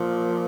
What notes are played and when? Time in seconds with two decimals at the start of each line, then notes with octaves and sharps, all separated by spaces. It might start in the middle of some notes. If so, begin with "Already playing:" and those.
Already playing: A#2 F3